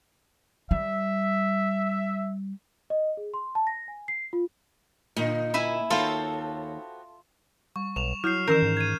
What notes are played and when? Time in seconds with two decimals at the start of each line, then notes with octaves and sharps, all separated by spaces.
0.71 G3 E5
2.90 D#5
3.17 G#4
3.34 C6
3.55 A5
3.67 A#6
3.88 G#5
4.08 C7
4.33 F4
5.16 A#2 D3 D#4
5.54 E4 E5 G#5
5.90 D#2 B3 C4 F4 F#4 A4 C#5
7.76 G3 C#6
7.96 B1 E7 F7
8.24 F#3 E4 F6 G6 C7
8.48 D#3 E3 C#4 A#4 G6 C7 E7
8.62 G#2
8.77 G#6 D#7